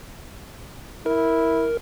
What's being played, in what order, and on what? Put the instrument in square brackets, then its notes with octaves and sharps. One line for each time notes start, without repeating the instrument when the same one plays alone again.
[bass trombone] E4 [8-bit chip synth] A#4